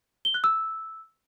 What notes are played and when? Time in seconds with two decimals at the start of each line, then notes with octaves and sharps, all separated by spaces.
0.25 G7
0.34 F#6
0.44 E6